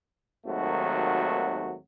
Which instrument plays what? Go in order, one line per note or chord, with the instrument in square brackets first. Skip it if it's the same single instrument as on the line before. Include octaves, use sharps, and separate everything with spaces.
[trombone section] G#1 D#2 F#3 A3 F#4